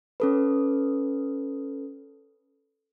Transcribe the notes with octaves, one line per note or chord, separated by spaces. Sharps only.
C#4 A4 B4